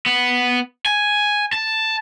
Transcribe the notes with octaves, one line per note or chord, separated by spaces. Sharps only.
B3
G#5
A5